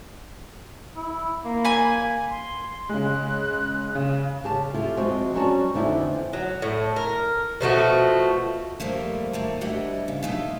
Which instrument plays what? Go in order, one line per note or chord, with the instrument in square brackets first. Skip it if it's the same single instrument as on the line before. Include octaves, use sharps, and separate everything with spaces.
[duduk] E4
A#3
[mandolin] G#5 B5
[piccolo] C6
[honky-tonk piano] C#3 G#3 [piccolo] F#6
[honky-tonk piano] C#3
[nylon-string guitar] C#3 G4 A5
E4 F4 G4 A4
F3 G#3 C4 F#4
F#3 G3 C#4 F#4 D5 A5
F2 D3 E3 F3 D#4 E4
[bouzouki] F#3
A2
A#4
B2 F3 A3 F#4
[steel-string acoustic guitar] F2 F3 G3 A3 A#3
D#3 A3 A#3
D2 G3 E4 D#5 F#5
C#3
B2 A3 D#4 F4 E5